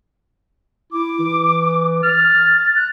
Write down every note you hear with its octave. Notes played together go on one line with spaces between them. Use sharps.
E4 D6
E3
F6 A6
F#6